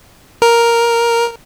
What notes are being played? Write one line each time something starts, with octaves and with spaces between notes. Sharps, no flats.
A#4